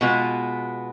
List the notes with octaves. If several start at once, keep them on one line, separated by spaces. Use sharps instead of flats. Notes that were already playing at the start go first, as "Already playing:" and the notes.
B2 G#3 B3 F4